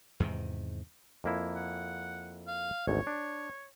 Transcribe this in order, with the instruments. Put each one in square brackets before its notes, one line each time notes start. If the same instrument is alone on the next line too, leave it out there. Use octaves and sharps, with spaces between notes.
[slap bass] E2 G#2 C3 D#3
[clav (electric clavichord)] F2 A#3 E4
[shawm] F#5
F5
[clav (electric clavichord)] G#1 D2 [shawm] C#5
[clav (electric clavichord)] D4